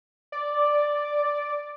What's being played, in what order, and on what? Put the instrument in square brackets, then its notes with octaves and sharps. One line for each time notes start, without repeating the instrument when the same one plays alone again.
[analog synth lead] D5